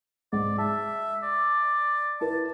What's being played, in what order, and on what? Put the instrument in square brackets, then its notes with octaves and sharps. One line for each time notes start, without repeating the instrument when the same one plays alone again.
[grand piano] G#2 [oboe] D5
[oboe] E5 [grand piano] A5
[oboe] D5
[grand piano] E4 A#4 B4 [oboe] A5